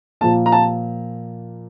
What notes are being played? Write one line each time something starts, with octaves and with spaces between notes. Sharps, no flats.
A#2 F3 A#3 A5
A#5
A5